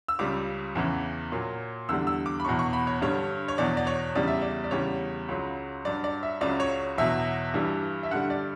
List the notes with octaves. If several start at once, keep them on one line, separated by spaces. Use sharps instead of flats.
E6
C#2 C#3 G3 D6
E2 C#3 E3
A#2 F#3
E2 D3 G3 E6
E6
D6
B5
E2 B2 F#3 C#6
C#6
B5
C#5
G2 D3 G3 C#5
C#5
E2 B2 F#3 D5
D5
C#5
E2 C#3 G3 D5
E5
D5
D5
E2 C#3 G3 C#5
C#2 C#3 F#3
G2 F#3 D5
D5
E5
C#2 C#3 F#3 D5
C#5
E2 B2 F#3 E5
G2 E3 G3
E5
G2 D3 G3 F#5
D5